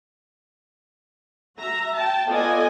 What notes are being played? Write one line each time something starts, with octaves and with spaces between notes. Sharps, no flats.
F#4 E5 A#5
G5 A5
B3 F4 A4 D5 D#5 G#5